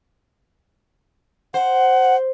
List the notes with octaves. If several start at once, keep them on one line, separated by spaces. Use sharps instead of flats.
C5 F#5